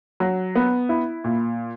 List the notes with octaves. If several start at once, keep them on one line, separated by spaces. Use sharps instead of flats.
F#3
B3
E4
A#2